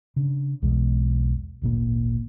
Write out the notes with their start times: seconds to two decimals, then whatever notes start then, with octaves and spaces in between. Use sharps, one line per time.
0.16 C#3 D4
0.62 B1 E2 B2 G#3
1.61 D1 G#1 A#2 A#3